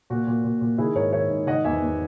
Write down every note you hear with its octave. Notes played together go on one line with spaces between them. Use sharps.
A#2 F#4
A#2
A#2
A#2
D#3 E4 G#4
G#2 A#4 C#5
D#3 C#5 E5
G#2
D#3 D#5 F#5
E2 E5 G#5
E2